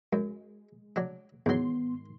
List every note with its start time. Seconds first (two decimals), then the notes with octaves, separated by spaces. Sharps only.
0.13 F#2 G#3
0.96 F#3 D4
1.46 E2 G#2 D#3 F#3 B3 C6